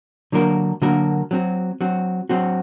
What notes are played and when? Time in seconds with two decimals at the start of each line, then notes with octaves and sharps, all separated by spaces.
0.32 D3 F#3 A#3 F#4 A#4
0.82 D3 F#3 A#3 F#4 A#4
1.31 F#3 C4 F#4
1.81 F#3 C4 F#4
2.29 F#3 C4 F#4